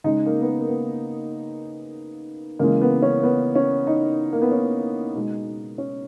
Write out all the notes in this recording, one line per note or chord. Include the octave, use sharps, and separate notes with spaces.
C#3 G#3 D#4
A#3
B3
A#3
A#3
B3
C#3 E3 G#3 A#3
B3
C#4
B3
C#4
D#4
A#3
B3
C#4
B2 G#3 D#4
C#4